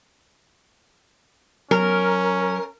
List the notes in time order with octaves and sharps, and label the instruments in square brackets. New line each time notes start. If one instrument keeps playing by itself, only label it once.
[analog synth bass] F#3 [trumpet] C#4 [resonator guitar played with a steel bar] A#4